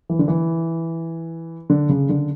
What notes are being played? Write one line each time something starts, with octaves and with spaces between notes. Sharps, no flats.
E3
D3
E3
D3
C#3
D3